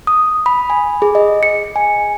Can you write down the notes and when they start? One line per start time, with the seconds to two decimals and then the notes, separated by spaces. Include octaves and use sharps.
0.07 D#6
0.46 B5
0.70 G#5
1.02 G#4
1.15 D#5
1.43 C#7
1.76 G#5